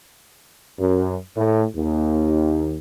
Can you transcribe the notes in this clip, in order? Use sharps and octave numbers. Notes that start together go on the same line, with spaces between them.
F#2
A2
D#2